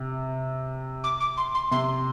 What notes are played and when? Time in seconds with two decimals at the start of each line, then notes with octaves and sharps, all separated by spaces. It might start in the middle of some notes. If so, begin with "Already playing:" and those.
Already playing: C3
1.04 D6
1.20 D6
1.37 C6
1.54 C6
1.71 C3 C6